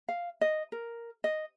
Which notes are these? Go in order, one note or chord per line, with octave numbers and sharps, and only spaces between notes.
F5
D#5
A#4
D#5